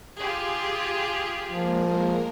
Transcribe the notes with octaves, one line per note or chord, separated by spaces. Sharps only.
F4 G4 G#4
F3 G#3 A#3 A#4